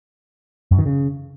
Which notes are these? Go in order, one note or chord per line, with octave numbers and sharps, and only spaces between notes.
F#2
D#3
C#3